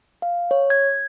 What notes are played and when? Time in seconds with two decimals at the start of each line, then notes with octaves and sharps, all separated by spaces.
0.22 F5
0.51 C#5
0.70 G#6